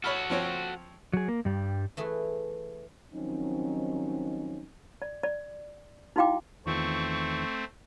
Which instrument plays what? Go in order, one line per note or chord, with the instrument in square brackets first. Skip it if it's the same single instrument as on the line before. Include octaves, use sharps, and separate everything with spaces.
[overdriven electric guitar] F#4 A4 [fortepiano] C#5 B5 F6
[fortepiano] F3 C4 C#5
[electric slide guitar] F#3 G#4
A#3
G2 G3
[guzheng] E3 A3 G#4
[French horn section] D#3 F3 F#3 C4 C#4 D#4
[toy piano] D5
D5
D#4 E4 F#4 F5 G5 D6
[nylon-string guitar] E2 D#3 F4 [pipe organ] A3 C4 [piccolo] C#6